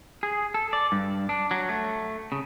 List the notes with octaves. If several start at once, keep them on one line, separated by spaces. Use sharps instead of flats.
G#4
A4
D5
G2
D4
F#3
A3
C#3